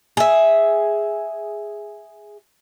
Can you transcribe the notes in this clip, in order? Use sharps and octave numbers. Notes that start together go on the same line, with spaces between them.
G#4 E5